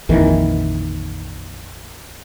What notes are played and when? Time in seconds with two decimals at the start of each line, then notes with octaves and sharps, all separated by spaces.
0.09 A#1 F2 D#3 E3